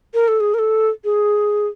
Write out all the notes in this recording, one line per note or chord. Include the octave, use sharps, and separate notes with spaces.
A#4
A4
G#4
A#4
A4
G#4